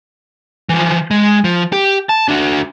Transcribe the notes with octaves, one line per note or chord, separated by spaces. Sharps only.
E3 F3
G#3
F3
G4
A5
D4 F#4